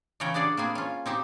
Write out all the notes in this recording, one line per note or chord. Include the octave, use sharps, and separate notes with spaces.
C#3 E3 C#4 C#5 G5 A#5
D4 F#4 G#4 D5
A#3 C4 G#4 B4
C#4 F4
C4 D#4 G4 C5